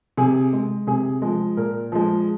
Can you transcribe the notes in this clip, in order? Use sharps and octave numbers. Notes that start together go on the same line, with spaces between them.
C3 G#4
G#3
C3 G#4
F3 G#3
A#2 A#4
F3 G#3